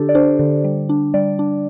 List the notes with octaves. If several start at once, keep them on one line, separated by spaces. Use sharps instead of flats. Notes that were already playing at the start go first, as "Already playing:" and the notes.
Already playing: D3 D4 G4 A4
D5
D4 C5
D3
G3
D4
G3 D5
D4